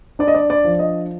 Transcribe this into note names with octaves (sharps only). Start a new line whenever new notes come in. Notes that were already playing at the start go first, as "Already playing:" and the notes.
D4 D5
D#5
D5
D5
F3
D#5